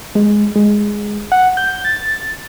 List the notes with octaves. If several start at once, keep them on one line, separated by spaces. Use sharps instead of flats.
G#3
G#3
F#5
G6
A6